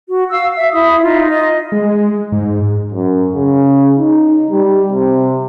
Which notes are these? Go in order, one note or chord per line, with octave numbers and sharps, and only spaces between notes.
F#4
F5 E6
E5
E4 E5 D#6
D#4 F4
D#5
G#3
G#2
F#2
C#3
D#4
G3
C3